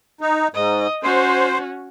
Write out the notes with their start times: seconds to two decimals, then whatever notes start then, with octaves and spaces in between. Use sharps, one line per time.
0.21 D#4
0.54 G#2 D#5
1.03 C#4 F#4 C5